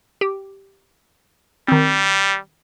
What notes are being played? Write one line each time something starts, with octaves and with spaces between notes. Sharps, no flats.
G4
D#3 G3 C4